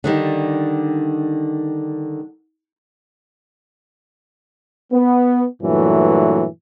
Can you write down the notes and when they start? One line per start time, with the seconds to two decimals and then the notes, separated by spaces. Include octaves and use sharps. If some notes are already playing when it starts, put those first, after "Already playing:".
0.04 D3 D#3 G3
4.92 B3
5.62 G2 A#2 E3 F#3 A3